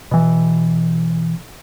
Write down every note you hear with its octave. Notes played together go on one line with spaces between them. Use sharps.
B2 E3